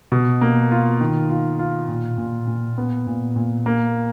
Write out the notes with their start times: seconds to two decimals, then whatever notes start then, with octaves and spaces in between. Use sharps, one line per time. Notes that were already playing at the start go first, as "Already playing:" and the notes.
0.12 B2
0.41 A#3
0.72 F4
1.00 D#3
1.30 F4
1.59 F4
1.88 A#2
2.18 A#2
2.47 A#2
2.78 B3
3.07 A#2
3.36 A#2
3.66 A#3